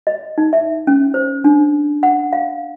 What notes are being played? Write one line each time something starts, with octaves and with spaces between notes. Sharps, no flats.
D#5
D#4
E5
C#4
C5
D4
F#5
F5